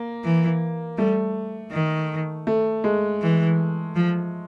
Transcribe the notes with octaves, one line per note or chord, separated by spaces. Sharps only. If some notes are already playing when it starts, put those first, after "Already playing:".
Already playing: A#3
E3
G3 A3
D#3
A3
G#3
E3
F3